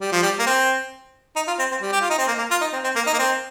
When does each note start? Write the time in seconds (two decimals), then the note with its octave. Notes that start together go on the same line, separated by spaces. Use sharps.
0.01 G3
0.12 F3
0.23 G3
0.39 A#3
0.46 C4
1.36 D#4
1.48 F4
1.59 C4
1.71 C4
1.82 G3
1.92 G4
2.01 F4
2.10 D#4
2.18 C4
2.28 A#3
2.38 A#3
2.51 F4
2.61 D#4
2.73 C4
2.84 C4
2.96 A#3
3.07 D#4
3.13 A#3
3.18 C4